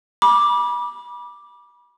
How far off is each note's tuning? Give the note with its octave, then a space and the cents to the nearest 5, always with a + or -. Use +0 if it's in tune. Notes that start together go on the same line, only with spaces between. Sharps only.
B5 -30 D6 +5